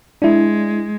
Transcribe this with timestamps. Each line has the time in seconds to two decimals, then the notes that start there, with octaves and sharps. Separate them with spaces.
0.22 G#3 D4 E4